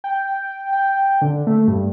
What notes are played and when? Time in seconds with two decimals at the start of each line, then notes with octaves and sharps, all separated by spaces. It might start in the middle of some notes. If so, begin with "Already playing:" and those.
0.04 G5
0.72 G5
1.22 D3
1.47 A3
1.68 G2